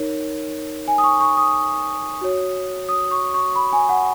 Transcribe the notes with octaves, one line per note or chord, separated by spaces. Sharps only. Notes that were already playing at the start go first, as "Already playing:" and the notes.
Already playing: D#4 A#4 C#5
G#5
D#6
C#6
C#6
D#6
F#4 C#5
D#6
C#6
C#6
B5
G#5
F#5